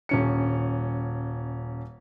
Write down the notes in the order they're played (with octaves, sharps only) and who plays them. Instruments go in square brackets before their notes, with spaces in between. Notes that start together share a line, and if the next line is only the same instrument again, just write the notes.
[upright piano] D#1 C#4 C#7